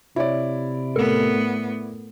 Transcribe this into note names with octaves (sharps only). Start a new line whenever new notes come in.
C3 E4 C#5 D5
A2 B3 A4 A#4